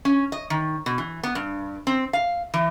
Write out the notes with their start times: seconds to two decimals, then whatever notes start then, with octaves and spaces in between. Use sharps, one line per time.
0.05 C#4
0.32 D#5
0.50 D#3
0.86 B2
0.98 E3
1.23 B3
1.35 G2
1.87 C4
2.13 F5
2.54 E3